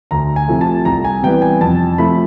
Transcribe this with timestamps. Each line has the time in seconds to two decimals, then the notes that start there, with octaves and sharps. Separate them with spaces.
0.11 D2 A#5
0.36 G#5
0.48 C3 F3 A3
0.61 A5
0.85 C2 A#5
1.04 G#5
1.23 C3 E3 G3 B3 G5
1.42 G#5
1.61 F2 A5
1.98 C3 F3 A3 B5